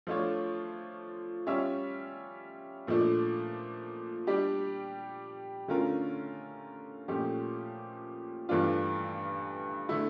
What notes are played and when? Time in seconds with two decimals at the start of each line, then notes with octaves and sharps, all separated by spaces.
0.07 F3 A3 D4 F4 C#5
1.47 G3 C#4 F4 C#5 E5
2.87 A#2 F3 A3 D4
4.27 G3 D4 G4
5.68 D3 A3 C#4 F4 A#4
7.08 A#2 F3 A3 C#4 G4
8.49 G2 E3 A3 D4 F4
9.89 D3 A3 E4